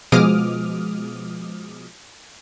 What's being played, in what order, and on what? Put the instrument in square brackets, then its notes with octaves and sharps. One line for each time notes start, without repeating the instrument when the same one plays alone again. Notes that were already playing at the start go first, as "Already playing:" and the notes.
[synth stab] B2 F3 G#3 D6 D#6 F6